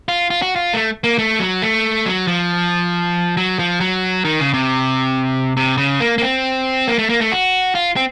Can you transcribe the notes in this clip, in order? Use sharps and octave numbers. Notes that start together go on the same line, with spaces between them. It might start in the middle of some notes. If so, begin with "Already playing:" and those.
F4
F4
F#4
F4
A3
A#3
A3
F#3
A3
F#3
F3
F#3
F3
F#3
D#3
C#3
C3
C3
C#3
A#3
A#3
C4
A#3
A3
A#3
A3
F#4
F4
C4